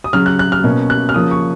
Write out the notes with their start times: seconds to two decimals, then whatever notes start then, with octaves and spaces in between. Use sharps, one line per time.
0.04 D#6
0.13 C#3 F#3 C#4 F6
0.26 F#6
0.39 F#6
0.52 F6
0.64 B2 A#3 C#4
0.90 F#6
1.09 F6
1.14 C#3 F3 A#3 C#4 D#6
1.31 C#6